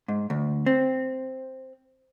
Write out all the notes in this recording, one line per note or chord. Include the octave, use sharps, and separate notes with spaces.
G#2
D2
C4